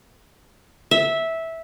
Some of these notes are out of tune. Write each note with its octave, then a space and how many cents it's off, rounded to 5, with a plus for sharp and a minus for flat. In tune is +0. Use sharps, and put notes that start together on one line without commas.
E5 -10